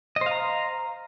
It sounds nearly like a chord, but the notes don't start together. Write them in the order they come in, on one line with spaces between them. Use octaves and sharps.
D#5 C5 F5 A#5